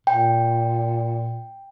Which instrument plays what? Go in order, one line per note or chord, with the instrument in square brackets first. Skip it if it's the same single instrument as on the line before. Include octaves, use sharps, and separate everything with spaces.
[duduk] A#2 [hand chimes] G5